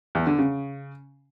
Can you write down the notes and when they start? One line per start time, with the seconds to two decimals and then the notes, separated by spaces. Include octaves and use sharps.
0.15 E2
0.27 D3
0.39 C#3